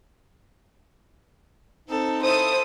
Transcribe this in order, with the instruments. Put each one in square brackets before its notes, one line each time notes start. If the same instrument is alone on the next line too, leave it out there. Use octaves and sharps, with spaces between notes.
[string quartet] C4 A4 [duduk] D#4
[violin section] E4 D#6 [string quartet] A4 [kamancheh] C5